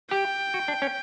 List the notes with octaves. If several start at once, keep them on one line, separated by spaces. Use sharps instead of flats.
G4 G5
F#4
D4
C#4